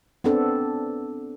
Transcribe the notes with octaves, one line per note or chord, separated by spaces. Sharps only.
B3 C4 D4 A4